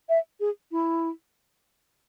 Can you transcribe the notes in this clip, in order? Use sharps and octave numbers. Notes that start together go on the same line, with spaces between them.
E5
G#4
E4